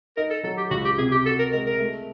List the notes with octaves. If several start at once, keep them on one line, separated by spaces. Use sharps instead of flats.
D#4 A#4
A4
F#3 A4
G4
C#2 F#4
G4
C3 G#4
G4
F#4 A4
A#4
G#3 A#4
A#4
A3